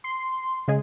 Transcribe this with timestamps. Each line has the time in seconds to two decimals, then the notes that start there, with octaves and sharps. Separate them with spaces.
0.04 C6
0.68 C#3 G#3 G#4